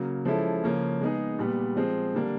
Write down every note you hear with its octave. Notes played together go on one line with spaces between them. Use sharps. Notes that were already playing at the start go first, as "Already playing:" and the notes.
Already playing: C#3 F#3 A#3
F3 G#3 C#4 E4 A4
C#3 F3 A#3 C#4
G#3 B3 D#4 G#4
A#2 G3 B3
F3 G#3 C4
D3 G3 A#3 D4